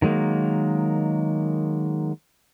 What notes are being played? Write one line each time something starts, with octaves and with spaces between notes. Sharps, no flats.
D#3 F#3 G#3 A#3